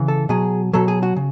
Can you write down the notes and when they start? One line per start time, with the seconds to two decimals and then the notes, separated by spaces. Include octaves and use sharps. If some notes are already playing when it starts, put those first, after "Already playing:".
Already playing: C#3 E3
0.08 A4
0.29 B2 F#3 G#4
0.73 B2 F#3 A4
0.88 G#4
1.03 F#4
1.16 C#3